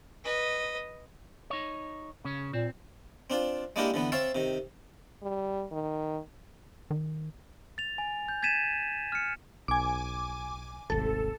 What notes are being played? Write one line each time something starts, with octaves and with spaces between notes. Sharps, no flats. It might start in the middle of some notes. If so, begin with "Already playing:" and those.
B4 D#5
D#4 C#5
C#3 C#4
A#2 C4
C4 D4 F4
G#3 A#3 D4 E4 G4 A#4
D3 E3 B3
C4 C#5 E5 F5 A5
C3 D#3
G3
D#3
D#3
A6 F7
G#5
G6
G#6 A6 B6 D#7 E7
F6 C#7
B1 G#5 D6
D#1 G#1 C3 A4